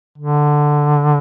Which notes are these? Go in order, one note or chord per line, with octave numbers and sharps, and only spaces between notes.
D3